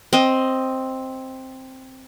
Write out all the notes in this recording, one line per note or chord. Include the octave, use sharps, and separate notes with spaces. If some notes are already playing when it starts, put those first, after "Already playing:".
C4 D#5